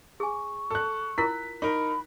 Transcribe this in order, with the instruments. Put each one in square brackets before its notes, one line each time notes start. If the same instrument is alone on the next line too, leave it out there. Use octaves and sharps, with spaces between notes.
[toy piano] G#4 G#5 [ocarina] C#6
[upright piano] A4 F#6
[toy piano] E4 F4 A#4 [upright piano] B6
[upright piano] D#4 A#4 [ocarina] B5 [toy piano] C#6